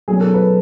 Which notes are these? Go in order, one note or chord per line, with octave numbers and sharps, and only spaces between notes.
B2 F#3 A3 C#4 G#4
A4
B4